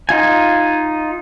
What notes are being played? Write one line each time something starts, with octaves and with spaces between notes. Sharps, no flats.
D#4 F4 G#5